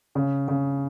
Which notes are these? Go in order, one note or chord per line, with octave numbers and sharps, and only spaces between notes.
C#3
C#3